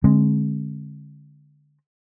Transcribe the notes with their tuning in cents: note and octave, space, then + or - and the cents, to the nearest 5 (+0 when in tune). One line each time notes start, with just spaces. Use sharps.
D3 +0 G#3 +0 C4 +35